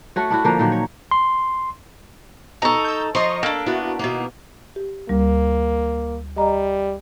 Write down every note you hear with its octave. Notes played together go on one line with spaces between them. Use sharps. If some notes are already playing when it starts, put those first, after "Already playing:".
A3 F#4 C#5
D4 E4 F#4
D3 F3 A#3
A#2 D#3 F3 F#3
C#5
C6
B2 D#4 A4 A#5 C#6
E6 G6
F3 D#5 A#5 C6 C#6
A#3 D4 A4
B3 E4 F#4
B2 D#3 A#3
G4
D2 G3 A#3
G3 D#5 A#5